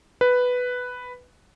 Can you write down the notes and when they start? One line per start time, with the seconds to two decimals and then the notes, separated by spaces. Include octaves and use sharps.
0.21 B4